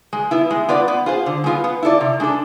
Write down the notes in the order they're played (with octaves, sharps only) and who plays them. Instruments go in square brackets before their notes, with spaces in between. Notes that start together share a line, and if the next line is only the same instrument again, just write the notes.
[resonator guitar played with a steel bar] G#3
B3 E4
G#3
B3 F4 B4 D5
B3
F4 G#4 C5
D3
G#3 B3 F4
B3
E4 A4 D5
C3
G#3 D4 A4